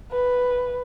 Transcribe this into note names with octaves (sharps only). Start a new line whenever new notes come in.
B4